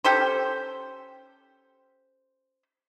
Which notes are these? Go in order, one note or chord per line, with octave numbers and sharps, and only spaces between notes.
C#4 G4 A4 C5